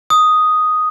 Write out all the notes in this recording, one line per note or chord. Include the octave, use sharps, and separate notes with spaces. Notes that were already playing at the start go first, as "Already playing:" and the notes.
D#6